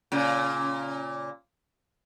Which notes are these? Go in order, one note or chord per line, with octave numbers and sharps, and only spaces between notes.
A#2 C#3